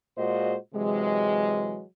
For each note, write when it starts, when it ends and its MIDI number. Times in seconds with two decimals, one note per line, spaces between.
0.18 0.55 46
0.18 0.55 56
0.18 0.55 65
0.18 0.55 66
0.18 0.55 72
0.18 0.55 75
0.75 1.82 48
0.75 1.82 52
0.75 1.82 54
0.75 1.82 56